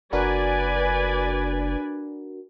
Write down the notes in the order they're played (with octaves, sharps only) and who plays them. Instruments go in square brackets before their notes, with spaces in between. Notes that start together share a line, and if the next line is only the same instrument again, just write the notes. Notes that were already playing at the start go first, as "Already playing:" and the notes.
[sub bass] F#1 [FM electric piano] D4 F#4 A#4 [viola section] B4 D5 G#5